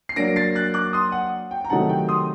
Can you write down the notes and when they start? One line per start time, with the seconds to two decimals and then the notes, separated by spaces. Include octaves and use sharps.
0.09 C7
0.16 F#3 A#3 D4 A#6 D7
0.36 A6 C7
0.55 F#6 A6
0.74 D6 F#6
0.93 C6 D#6
1.12 F#5
1.51 G5
1.65 A#5
1.70 C3 D#3 F#3 A3 D#4 F#5 A5
1.89 G5
2.09 C6 D#6